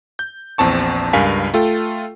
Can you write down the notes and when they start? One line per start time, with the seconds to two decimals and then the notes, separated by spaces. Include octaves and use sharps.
0.19 G6
0.58 A#1 E2 C4 A5 C#6
1.13 C#2 G2 A#4 F5 G#5 B6
1.54 A3 F4 A4 G5